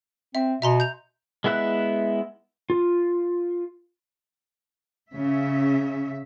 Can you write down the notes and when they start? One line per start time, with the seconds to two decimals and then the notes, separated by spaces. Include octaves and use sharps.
0.35 C4 E5
0.62 B2 E5 A#5 C6
0.80 G6 F7
1.44 G#3 B3 E4 E5 F#6
2.70 F4
5.11 C#3 E5